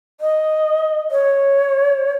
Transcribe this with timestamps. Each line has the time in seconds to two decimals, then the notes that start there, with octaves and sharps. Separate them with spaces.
0.21 D#5
1.11 C#5